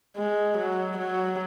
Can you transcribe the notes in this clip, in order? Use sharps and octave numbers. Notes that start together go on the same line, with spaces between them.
G#3
F#3
F#3